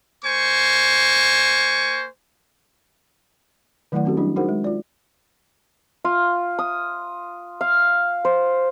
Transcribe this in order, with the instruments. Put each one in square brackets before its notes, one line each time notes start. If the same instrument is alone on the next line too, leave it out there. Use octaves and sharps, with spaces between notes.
[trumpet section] A#3 C5 G#5 C#6
[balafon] D#3 F#3 A3 E4 D5 F#5
C4 C#4 F#4 G4 A4
F#3 G3 D4 E4
D#4 F#4 G#4 A#4 C5 F#5
G#3
F4 D5
[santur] F4
D#6
F5
C5